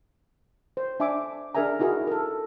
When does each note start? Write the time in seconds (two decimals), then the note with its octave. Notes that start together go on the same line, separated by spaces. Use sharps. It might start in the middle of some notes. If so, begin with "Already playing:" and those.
0.77 C5
1.00 D4 E5 G#5 D6
1.55 D4 G#4 A#4 E5 G#5 A#5
1.79 D#4 E4 F#4 G#4 A#4
2.07 A4 A#4